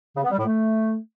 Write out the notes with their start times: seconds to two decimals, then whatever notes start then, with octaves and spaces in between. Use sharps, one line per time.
0.16 C#3
0.24 B3
0.31 G3
0.38 A2
0.46 A3